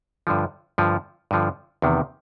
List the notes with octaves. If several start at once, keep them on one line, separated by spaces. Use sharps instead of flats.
G2 D3 F3
G2 D3 F3
G2 D3 F3
E2 C3 D#3